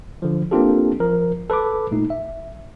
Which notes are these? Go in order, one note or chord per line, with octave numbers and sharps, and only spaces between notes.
D3 F3
A#3 C4 D4 F4 G4 A4
F3 A#4
A4 B4 B5 D6
G#1 A#2 A3 D#4
E5